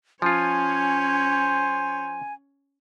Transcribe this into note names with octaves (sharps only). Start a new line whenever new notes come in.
F3 C#4 F4 C5 C#5 G#5